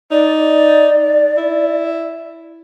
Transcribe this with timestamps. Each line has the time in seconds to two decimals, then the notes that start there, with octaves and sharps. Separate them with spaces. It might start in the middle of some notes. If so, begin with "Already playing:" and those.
0.11 D#4 D5
1.37 E4